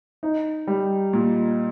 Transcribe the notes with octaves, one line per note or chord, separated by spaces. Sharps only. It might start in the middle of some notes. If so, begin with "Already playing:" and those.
D#4
G3
A#2